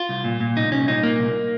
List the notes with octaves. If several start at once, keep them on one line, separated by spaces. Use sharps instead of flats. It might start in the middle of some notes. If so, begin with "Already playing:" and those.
Already playing: F4
C2
A#2
A#2
C2 D#4
C2 C#4
A#2 D#4
A#2 A#3
C2